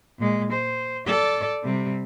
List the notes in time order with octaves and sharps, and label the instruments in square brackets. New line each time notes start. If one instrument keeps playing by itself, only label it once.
[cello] A#2 G#3
C5
A4 D5
C3 G3